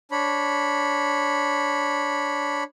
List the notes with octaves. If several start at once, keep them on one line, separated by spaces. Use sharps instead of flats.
D4 C#5 B5